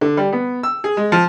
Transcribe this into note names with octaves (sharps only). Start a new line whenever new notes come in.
D3
G3
B3
E6
G#4
G#3
F3